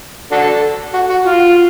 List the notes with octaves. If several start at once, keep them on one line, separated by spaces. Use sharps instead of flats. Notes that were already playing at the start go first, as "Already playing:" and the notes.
D4 F#4 A4
F#4
F#4
F4